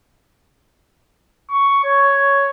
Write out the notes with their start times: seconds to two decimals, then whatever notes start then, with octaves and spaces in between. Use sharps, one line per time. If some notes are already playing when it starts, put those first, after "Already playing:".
1.50 C#6
1.84 C#5